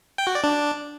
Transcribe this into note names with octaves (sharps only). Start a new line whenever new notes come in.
G5
F#4
D5
D4